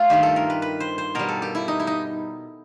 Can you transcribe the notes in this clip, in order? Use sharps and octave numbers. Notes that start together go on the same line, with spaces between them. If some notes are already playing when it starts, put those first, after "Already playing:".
Already playing: A3 F4
G2 D#3 G3 G4
A4
A#4
B4
B4
C5
C5
B2 G3 A#4
A4
G4
E4
D#4
E4
D#4